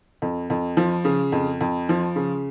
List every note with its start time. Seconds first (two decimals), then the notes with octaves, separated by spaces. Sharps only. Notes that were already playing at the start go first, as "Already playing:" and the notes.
0.22 F2
0.50 F2
0.77 F3
1.05 C#3
1.32 F2
1.61 F2
1.89 F3
2.16 C#3